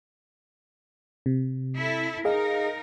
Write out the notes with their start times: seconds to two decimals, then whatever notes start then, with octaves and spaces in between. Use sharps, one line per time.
1.26 C3
1.77 E4 A4
2.25 D#4 G#4 A#4 D#5 F5